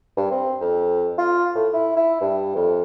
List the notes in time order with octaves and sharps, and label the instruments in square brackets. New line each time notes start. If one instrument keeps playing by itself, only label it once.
[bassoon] G2
C4
F2
F4
A2
E4
E4
G2
F2